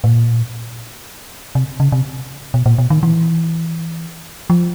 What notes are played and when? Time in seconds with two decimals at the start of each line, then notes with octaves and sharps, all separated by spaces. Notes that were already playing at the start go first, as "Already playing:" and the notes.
0.04 A2
0.08 A#2
1.55 C3
1.80 C#3
1.92 C3
2.54 B2
2.66 A#2
2.78 B2
2.90 D#3
3.03 E3
4.50 F3